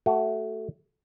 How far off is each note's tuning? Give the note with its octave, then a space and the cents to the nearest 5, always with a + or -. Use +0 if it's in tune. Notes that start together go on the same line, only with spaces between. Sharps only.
A3 +0 F#4 +25